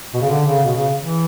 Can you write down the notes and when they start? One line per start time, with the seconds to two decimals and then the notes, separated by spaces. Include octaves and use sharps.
0.14 B2
0.21 C#3
0.29 D3
0.46 C#3
0.64 B2
0.75 C#3
0.99 E3